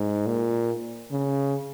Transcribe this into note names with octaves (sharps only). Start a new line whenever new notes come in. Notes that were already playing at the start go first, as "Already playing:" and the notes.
Already playing: G#2
A#2
C#3